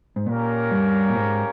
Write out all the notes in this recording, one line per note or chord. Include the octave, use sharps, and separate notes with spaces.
G#2
A#2 A#3 C#4 G4 A#4 C#5
G2
A#2
G#2